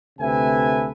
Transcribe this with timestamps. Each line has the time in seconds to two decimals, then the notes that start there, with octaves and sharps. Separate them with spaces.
0.20 D2 C3 A4 B4 E5 G#5